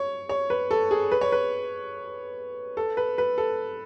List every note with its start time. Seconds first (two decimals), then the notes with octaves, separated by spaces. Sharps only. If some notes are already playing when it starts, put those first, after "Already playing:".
Already playing: C#5
0.29 C#5
0.50 B4
0.71 A4
0.91 G#4
1.12 B4
1.21 C#5
1.32 B4
2.77 A4
2.97 B4
3.18 B4
3.38 A4